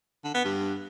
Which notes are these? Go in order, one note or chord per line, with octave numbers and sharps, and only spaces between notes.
D3
B3
G2